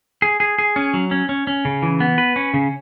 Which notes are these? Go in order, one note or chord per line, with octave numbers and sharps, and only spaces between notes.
G#4
G#4
G#4
C#4
F#3
C#4
C#4
C#4
C#3
E3
B3
B4
C#4
C#3